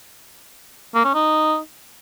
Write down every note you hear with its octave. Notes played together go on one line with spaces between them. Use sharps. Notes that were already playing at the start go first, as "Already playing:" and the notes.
A#3
C#4
D#4